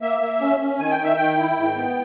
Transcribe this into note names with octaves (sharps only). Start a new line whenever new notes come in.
A#3 E5
A#3
C#4
C#4
D#3 G#5
G5
D#3
E5
D#3 G5
E4
G#2
B3